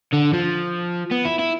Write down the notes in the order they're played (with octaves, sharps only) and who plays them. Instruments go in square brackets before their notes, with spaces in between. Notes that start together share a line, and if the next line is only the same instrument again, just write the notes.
[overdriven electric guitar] D3
F3
B3
E4
E4